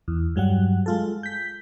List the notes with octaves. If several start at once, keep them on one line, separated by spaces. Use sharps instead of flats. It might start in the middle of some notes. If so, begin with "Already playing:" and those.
E2
G2 F#3 G3 F#5
G#3 F4 A4
G6 B6